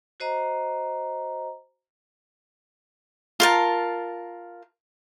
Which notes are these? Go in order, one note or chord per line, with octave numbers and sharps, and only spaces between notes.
F#4 C5 D#5 A#5
F4 A#4 A5